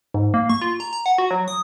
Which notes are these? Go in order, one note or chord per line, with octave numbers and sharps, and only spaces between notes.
G#2
A#3
C#6
F4
A#5
A#5
F#5
F#4
F#3
D#6